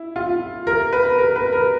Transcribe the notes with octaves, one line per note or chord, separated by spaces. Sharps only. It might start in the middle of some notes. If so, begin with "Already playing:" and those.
Already playing: E4
F4
A#4
B4
A#4
B4
A#4